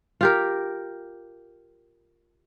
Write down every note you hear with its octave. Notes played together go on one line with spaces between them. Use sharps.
F4 G4 A#4